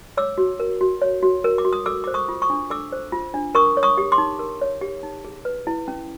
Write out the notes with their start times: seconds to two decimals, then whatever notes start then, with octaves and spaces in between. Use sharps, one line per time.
0.17 C#5 D6 E6
0.38 F#4
0.60 A#4
0.81 F#4
1.02 C#5
1.23 F#4
1.44 A#4
1.58 D6
1.65 F#4
1.73 D#6
1.86 A4 D6 E6
2.04 C5 D6
2.14 C#6 D#6
2.29 F4
2.42 C#6 D#6
2.50 D4
2.70 A4 D6 E6
2.92 C5
3.12 F4
3.34 D4
3.55 A#4 C#6 D#6
3.77 C#5
3.83 C#6 D#6
3.98 G4
4.12 C6 D6
4.18 D#4
4.39 A#4
4.61 C#5
4.81 G4
5.03 D#4
5.25 G#4
5.45 B4
5.67 E4
5.88 C#4